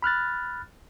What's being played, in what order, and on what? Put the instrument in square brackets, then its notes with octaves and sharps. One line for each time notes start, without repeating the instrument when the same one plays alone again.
[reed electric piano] B5 F6 F#6 A6